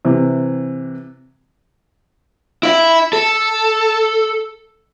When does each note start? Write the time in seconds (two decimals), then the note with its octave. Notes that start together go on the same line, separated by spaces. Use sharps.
0.05 C3 E3
2.63 E4 E5
3.13 A4